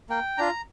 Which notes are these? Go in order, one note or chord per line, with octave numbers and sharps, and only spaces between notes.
A#3 G5
D4 F4 A#5